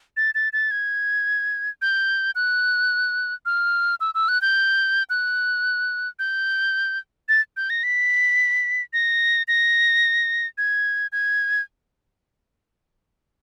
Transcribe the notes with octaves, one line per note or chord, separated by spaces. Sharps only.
A6
A6
A6
G#6
G6
F#6
F6
E6
E6
F#6
G6
F#6
G6
A6
G6
A#6
B6
A#6
A#6
G#6
G#6